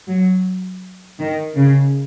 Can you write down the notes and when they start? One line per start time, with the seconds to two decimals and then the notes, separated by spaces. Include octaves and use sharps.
0.08 F#3
1.20 D#3
1.55 C#3